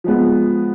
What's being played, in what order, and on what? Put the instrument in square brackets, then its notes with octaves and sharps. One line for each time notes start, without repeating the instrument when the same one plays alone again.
[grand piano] F3 G#3 B3